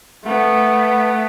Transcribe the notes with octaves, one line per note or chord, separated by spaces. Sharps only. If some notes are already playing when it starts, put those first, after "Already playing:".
A3 B3